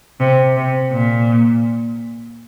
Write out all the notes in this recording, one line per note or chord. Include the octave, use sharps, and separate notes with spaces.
C3
C3
A#2